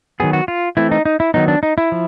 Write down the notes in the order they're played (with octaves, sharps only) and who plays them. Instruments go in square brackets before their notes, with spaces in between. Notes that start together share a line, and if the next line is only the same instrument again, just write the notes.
[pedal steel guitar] D#3 F#3 B3 G#4
F#4
F4
E3 A3 C4 E4
D#4
D#4
E4
D#3 F#3 B3 D#4
D4
D#4
E4
F3